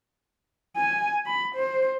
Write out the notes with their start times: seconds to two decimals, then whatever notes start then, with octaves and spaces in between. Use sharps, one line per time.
0.77 G#5
1.26 B5
1.56 C5